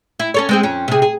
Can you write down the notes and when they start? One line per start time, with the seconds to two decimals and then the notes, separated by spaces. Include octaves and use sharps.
0.20 E4
0.34 C#4 A4 C#5
0.49 G#3 C4 G#4
0.63 F2 C#4
0.88 C3 G#4
1.02 G#4